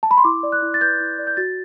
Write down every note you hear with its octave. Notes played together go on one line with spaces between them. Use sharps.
A5
B5
C6
E4 D6
D5
F#6
E4
A6
B4 G6
E4
D5
G6
F#4 A6